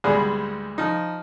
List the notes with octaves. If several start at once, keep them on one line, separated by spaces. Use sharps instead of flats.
D2 G#2 G3 B3 G#4
F3 D#4